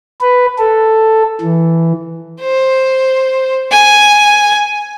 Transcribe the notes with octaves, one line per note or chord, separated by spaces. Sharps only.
B4
A4
E3
C5
G#5